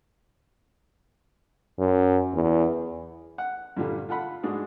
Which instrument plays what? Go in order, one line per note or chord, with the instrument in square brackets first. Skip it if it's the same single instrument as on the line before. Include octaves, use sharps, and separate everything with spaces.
[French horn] F#2
E2
[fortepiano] F#5
G2 A#2 D3 G3
F4 A4 F#5 B5
G#2 G#3 D4 F#4 D#6